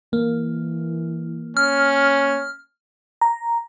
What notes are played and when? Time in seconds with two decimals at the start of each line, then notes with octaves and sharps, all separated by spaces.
0.13 E3 A#3
1.57 C#4 F6
3.21 A#5